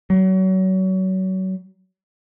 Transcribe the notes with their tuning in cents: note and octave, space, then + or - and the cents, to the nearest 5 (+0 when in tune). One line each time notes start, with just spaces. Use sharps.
F#3 +30